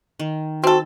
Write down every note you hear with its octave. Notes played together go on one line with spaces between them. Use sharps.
D#3
C4 F#4 A4